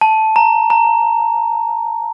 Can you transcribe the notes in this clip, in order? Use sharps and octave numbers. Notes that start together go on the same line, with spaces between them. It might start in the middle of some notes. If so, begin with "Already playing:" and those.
A5
A#5
A#5